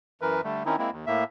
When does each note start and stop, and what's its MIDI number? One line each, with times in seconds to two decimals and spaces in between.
0.21 0.41 42
0.21 0.41 52
0.21 0.41 70
0.21 0.41 71
0.44 0.63 50
0.44 0.63 55
0.44 0.63 57
0.66 0.76 51
0.66 0.76 60
0.66 0.76 61
0.66 0.76 63
0.66 0.76 64
0.78 0.90 56
0.78 0.90 58
0.78 0.90 60
0.78 0.90 64
0.91 1.05 39
1.07 1.24 45
1.07 1.24 58
1.07 1.24 76